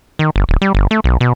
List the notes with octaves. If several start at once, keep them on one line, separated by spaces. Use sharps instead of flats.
D#3
G1
D1
G3
G1
A3
B1
B2